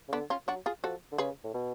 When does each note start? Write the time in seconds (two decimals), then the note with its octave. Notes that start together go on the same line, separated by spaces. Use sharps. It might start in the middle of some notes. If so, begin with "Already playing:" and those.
0.08 C#3
0.12 D3 B3 D4
0.30 C#4 F4
0.47 F#3 D4 F#4
0.66 F4 G#4
0.83 F3 F#4 A4
1.12 D3
1.18 C#3 G#4 B4
1.44 A2
1.54 B2